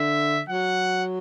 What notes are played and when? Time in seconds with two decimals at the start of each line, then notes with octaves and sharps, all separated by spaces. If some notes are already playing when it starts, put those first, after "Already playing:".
Already playing: D3 E5
0.49 F#3 F#5